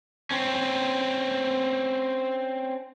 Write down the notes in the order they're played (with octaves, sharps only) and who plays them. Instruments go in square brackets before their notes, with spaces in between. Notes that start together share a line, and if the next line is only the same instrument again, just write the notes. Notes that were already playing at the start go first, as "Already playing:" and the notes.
[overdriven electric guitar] C4 C#4